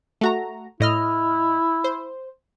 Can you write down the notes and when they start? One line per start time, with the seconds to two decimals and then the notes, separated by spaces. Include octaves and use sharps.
0.21 A3 F#4 A#5
0.80 A2 E4 D#5 F6
1.84 C5